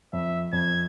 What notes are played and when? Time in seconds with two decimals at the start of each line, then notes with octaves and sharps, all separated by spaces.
0.13 F2 E5
0.53 F2 G#6